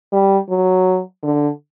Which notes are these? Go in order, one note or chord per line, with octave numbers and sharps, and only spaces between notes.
G3
F#3
D3